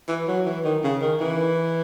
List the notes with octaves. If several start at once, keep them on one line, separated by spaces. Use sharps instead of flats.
E3
F#3
E3
D#3
C#3
D#3
E3